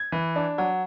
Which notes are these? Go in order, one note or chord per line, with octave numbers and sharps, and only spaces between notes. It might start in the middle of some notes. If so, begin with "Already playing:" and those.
Already playing: G#6
E3
D4
F#3